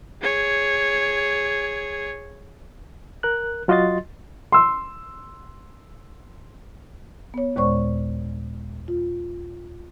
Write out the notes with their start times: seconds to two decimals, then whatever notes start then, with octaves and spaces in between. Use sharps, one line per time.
0.21 G#4 C#5
3.23 A#4 F#6
3.68 F#3 F4 F#4 D#5 C6 A6
4.52 C6 E6
7.34 B3 C#5
7.56 D#2 A#2 G#3 C5 D5 C#6
8.88 F4